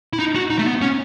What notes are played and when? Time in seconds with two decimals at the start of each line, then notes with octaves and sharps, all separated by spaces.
0.13 E4
0.19 D#4
0.35 F#4
0.50 D#4
0.59 A3
0.67 B3
0.82 C#4